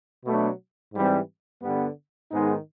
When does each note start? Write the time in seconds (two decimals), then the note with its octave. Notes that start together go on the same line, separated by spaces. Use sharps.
0.25 B2 F#3 A3 D4
0.93 G#2 E3 G3 C4
1.62 G2 D3 G3 B3
2.31 G#2 D#3 G#3 B3 D#4